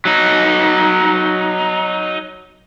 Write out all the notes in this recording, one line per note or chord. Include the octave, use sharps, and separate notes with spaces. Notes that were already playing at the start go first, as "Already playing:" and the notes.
F#3 D#4